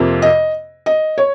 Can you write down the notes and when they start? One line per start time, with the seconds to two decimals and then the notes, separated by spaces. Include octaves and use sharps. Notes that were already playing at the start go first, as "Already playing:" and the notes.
Already playing: F2 C3 F3 A#3
0.22 D#5
0.86 D#5
1.18 C#5